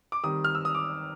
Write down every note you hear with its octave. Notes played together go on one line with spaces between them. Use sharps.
D6
D#3 G3 C4 D#6
F6
E6
D#6
D6